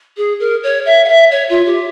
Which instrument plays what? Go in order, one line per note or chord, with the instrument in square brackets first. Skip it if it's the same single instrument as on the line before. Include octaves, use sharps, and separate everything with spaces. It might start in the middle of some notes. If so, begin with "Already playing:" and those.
[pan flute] G#4
A#4
C#5
E5
F5
E5
C#5
F4
G4